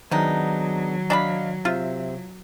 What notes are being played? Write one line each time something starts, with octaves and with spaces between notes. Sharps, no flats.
C3 D#3 F#3 B3 D4 D#4 G#4
D4 D#5 F5 A5 B5
C3 F4 C5 E5